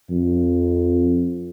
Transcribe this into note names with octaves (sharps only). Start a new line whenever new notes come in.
F2